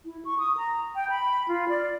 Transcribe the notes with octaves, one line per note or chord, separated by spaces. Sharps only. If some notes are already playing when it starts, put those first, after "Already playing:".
E4
C#6
D#6
A#5
G5
B5
F4
D5